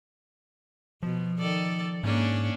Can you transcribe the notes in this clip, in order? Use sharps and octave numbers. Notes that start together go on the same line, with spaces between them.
B2 F3
D#3 A4 D5
G#2 A#3 C#4 D4